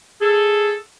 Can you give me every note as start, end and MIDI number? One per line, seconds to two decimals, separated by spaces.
0.20 0.74 68
0.20 0.74 69